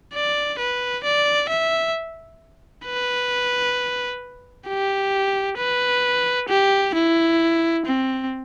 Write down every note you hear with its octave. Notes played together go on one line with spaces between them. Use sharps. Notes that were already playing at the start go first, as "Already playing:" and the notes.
D5
B4
D5
E5
B4
G4
B4
G4
E4
C4